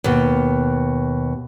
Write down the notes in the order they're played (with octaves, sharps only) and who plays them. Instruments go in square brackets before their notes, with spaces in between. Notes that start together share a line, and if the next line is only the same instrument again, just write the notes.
[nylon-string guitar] D#2 B2